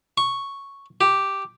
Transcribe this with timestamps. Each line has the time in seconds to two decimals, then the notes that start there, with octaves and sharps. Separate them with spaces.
0.18 C#6
1.01 G4